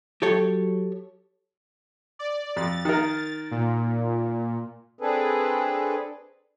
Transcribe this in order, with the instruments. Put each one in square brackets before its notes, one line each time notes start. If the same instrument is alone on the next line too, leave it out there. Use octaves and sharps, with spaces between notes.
[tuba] F#3 [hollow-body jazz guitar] G4 A4 C#5
[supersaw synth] D5
[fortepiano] F2 [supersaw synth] A6
[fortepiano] D#3 A#4
[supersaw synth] A#2
[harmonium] C4 D4 G#4 A4 B4